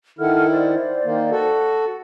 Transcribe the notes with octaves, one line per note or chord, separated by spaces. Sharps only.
D#3 E4 A4 F#5 F6
C5 D5
D#3 A#3
F#4 A4